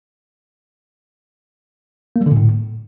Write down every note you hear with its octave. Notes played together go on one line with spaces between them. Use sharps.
A#3
G3
D3
A#2
A2